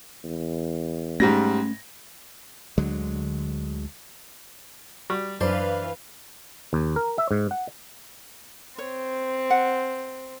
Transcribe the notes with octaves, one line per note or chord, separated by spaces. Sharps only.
E2
G#2 G3 A3 C#4 A#6
D2 D3 F#3 G#3
G3 F#4
F#2 E3 D4 B4 C5 F5
D#2
A#4
E5
G#2
F#5
C4 C#5
F#5